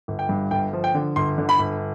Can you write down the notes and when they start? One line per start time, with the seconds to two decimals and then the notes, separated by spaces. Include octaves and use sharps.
0.08 G1
0.19 G5
0.29 G2
0.51 G1 G5
0.73 F3
0.84 G5
0.95 D3
1.16 G1 C6
1.38 D3
1.49 B5
1.59 G1